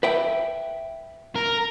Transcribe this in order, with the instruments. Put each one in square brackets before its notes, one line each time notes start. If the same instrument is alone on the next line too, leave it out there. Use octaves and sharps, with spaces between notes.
[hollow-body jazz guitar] B4 E5 G5
[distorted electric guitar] A#4